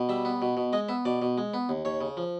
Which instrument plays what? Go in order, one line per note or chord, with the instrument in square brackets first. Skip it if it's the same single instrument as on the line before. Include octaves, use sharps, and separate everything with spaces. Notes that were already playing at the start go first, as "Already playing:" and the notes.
Already playing: [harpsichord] B2
G3 E5
B3
B2
B2
G#3 D#5
B3 E5
B2 D5
B2
G#3
B3
D#2
D#2 C#5
C#3
F3